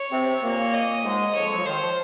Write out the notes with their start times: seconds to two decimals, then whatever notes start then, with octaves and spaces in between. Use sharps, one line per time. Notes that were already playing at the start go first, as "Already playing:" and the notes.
Already playing: C#5
0.12 C3 C4
0.43 A#2 A#3
0.74 D#5
1.04 G#2 G#3
1.35 F2 F3 C#5
1.45 G#3
1.51 F#3
1.59 F3
1.65 D#2 D#3 C5
1.82 F3